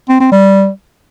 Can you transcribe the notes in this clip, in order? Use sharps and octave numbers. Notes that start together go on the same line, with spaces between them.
C4
C4
G3